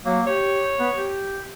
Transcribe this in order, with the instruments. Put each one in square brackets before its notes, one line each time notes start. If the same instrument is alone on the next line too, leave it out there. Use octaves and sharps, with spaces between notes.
[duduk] F#3 [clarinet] A#3
[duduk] G4 [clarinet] C#5
[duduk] B3
G4